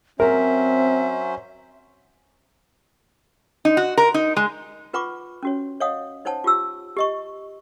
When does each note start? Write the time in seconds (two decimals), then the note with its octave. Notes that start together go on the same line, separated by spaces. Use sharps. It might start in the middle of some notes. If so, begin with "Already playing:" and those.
0.20 F#3 C4 C#4 A#4 C5 E5
3.65 D#4
3.77 F#4
3.97 A#4
4.14 D#4
4.36 G#3
4.93 F4 B4 F#5 B5 C#6 D6
5.43 C#4 F#4 C#5
5.80 C#5 D#5 F5 F#5 D#6
6.25 D#4 C5 C#5 F#5 A5
6.44 F4 G4 E6
6.97 G4 D#5 C#6